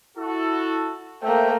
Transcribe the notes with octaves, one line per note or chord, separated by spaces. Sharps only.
E4 F#4 A4
A3 A#3 C5 E5 G5